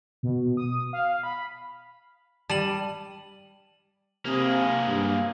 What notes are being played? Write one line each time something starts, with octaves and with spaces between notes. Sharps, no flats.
B2
D#6
F5
B5
G3 A5 D#7 F#7
C3 A#3 G#4
G2